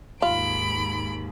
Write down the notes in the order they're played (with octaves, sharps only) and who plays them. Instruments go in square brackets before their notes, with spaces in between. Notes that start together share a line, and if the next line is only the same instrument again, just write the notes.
[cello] D#2 G#2 [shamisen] F4 [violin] B5 D7